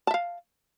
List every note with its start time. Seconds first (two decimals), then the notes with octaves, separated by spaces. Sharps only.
0.07 A5
0.11 E5
0.14 F5